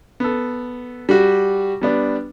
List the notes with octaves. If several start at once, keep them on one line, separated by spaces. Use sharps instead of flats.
B3 A4
G3 F#4 G4
G3 B3 D4